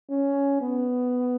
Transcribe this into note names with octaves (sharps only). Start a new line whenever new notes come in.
C#4
B3